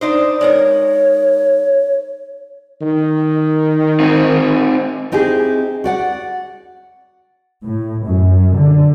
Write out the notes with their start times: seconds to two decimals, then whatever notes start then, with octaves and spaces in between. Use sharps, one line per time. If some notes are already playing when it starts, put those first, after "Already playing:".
0.01 D4 D#4 C5
0.41 G#3 D#4 A#4 C#5
2.82 D#3
4.00 C4 D#4
5.12 C4 D#4 E4 G4 G#4
5.84 F#4 D5 F#5
7.63 A2
8.06 F#2
8.58 D3